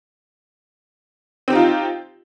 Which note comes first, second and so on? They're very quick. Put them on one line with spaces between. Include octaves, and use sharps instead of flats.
C4 G4 D#4 F4